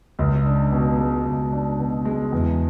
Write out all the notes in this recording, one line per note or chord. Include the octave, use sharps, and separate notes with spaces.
C#2
D4
B2
G#3
C#2
D4
B2
G#3
E2